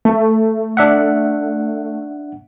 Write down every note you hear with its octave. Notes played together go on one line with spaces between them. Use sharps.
A3
D4 E5 F#5